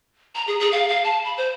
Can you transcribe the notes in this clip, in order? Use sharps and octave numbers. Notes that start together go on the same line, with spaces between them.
A#5
G#4
G#4
F5
F5
A5
B5
C5